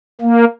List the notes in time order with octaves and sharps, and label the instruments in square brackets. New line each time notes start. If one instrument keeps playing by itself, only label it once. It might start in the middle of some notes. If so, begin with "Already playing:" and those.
[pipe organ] A#3